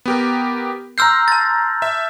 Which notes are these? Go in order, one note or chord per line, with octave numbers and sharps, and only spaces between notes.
B3 G4 A#4
A#5 C6 E6 F6 G6 C7
A5 A6
E5